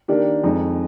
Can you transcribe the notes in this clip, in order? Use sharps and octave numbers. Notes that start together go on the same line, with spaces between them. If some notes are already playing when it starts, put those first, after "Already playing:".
D#3 A#3 D4 G4
F2 D#3 G#3 D#4